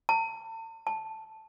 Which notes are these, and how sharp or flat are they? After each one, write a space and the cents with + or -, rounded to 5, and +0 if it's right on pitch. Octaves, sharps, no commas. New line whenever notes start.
A5 +40
A5 +0